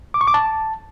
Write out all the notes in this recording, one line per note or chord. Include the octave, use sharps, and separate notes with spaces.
D6
C#6
D6
A5